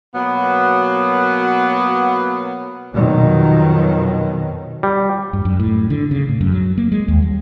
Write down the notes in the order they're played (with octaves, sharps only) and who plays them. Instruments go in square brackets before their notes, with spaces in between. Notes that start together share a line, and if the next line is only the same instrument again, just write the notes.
[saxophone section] B2 F#3 A#3 B3
[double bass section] F2 B2 D#3 F#3
[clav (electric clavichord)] G3
[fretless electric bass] G2
F#2
A2
D3
C#3
A2
F#2
F#3
A#3
G#3
D#2
G3